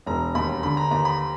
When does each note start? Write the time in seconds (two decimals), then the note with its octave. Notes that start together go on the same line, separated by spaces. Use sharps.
0.07 E1 A#5
0.35 D#2 B5
0.63 D3 B5
0.77 A#5
0.91 D#2 A#5
1.05 B5